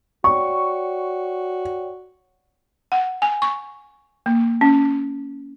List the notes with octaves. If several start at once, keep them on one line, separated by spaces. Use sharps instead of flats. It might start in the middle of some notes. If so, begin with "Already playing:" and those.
F#4 C#5 D5 G5 C#6
F#5
G#5
C#6
A#3
C#4